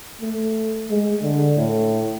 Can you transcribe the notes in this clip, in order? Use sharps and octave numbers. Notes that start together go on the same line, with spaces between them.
A3
G#3
D3
A2